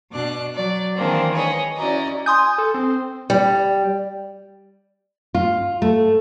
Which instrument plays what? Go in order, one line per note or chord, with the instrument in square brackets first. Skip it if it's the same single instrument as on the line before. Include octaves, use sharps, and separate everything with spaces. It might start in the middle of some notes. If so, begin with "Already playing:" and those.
[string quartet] B2 D4 D6 F#6
F#3 D5
D#3 E3 G#3 A#3 C4 D4
G#4 B4 C#5 D#5
C#4 E4 F#4 D5 D#5 A#5
[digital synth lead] G#5 [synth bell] C6 D#6 G6
[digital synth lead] A4
C4
[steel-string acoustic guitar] G3
[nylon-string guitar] F4
A3